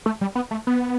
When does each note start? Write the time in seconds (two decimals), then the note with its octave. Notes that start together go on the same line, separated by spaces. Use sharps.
0.06 A3
0.21 G3
0.35 B3
0.51 A3
0.67 B3